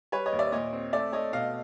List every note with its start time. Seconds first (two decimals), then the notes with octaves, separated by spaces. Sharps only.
0.12 G3 B4 C#5
0.26 C#5 D#5
0.32 D#2
0.39 D5 E5
0.52 A#2 C#5 D#5
0.73 C4
0.93 A3 D5 E5
1.13 A3 C#5 D#5
1.33 B2 D#5 F5